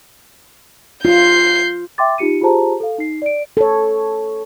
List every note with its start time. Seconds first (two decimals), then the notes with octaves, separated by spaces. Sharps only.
1.05 F4 G6 C7
1.98 E5 G5 C6 D6 A6
2.18 D#4 F4 G4 C#7 D#7
2.41 F4 G4 G#4 C5 A5 A#5
2.80 A4 F5
2.98 D#4 C7
3.22 D5 D7
3.57 A4 C#5